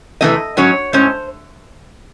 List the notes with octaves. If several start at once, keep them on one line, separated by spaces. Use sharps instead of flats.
C3 E3 A3 C4 D#4 D#5
G#2 F#3 C#4 C#5
A2 G#3 C#4 C5